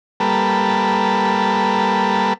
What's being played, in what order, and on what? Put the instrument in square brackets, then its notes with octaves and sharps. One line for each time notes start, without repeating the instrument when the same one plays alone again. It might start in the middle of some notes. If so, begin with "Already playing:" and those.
[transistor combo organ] G3 A#3 A4 B4